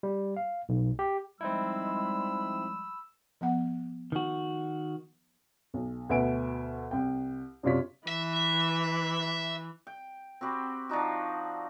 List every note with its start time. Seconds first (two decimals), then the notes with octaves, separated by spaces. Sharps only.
0.03 G3
0.37 F5
0.69 B1
0.99 G4
1.41 F3 G3 G#3 C4 D#4 E4 B5 E6
3.41 F3 B3 F#5
4.12 D#3 F#4
5.74 B1
6.09 D2 B2 B4 E5 G#5 D7
6.91 C2 G5
7.63 F#2 C3 D4 F4 C#5 B6
8.08 E3 E5
9.87 G5
10.41 C4 F#4 G4 B5
10.89 F3 D4 D#4 F#4